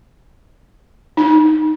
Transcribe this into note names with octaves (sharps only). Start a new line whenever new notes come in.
D#4